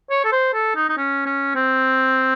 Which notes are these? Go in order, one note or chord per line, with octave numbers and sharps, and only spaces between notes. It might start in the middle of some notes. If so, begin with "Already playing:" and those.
C#5
A4
C5
A4
D#4
D#4
C#4
C#4
C4